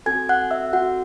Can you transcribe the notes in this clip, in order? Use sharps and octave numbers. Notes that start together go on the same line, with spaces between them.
C4 F#4 A4 G#5 G#6
F#5 F#6
E5 E6
F#4 F#5